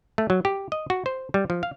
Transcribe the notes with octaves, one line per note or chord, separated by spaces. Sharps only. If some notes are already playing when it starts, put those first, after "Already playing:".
A3
F#3
G4
D#5
F#4
C5
G3
F3
F5